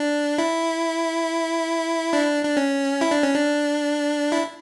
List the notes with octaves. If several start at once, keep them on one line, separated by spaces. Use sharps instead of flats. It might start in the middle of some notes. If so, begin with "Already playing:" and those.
Already playing: D4
E4
D4
D4
C#4
E4
D4
C#4
D4
E4